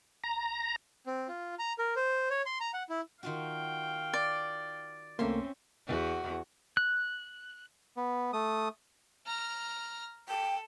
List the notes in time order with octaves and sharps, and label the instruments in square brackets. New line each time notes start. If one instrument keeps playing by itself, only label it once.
[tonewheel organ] A#5
[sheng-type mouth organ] C4
F4
A#5
A#4
C5
C#5
C6
A#5
F#5
E4
[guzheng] D#3 F4 F#4 [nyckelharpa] F5 G5
[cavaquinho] D5
[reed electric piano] C2 A3 A#3 [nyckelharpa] C4 [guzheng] C#4 E5 C6
[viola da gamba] E2 F#4
[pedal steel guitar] F#6
[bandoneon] B3
A3 D#6
[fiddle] A#5 F6
[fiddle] A4 [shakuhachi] G5